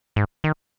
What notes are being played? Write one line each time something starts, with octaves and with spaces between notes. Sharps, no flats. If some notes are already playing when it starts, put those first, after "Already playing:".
G#2
D#3